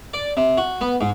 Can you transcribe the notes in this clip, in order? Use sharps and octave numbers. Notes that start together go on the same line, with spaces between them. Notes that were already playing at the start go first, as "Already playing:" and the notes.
D5
C3
F#4
B3
G#2